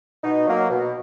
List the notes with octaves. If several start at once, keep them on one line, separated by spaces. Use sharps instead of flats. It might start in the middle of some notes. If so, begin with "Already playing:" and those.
B2 D#4
F#3 A#3
B2